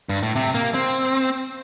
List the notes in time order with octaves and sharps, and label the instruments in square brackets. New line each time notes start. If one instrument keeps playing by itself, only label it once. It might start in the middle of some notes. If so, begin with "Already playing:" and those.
[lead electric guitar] G2
A2
C3
A#3
C4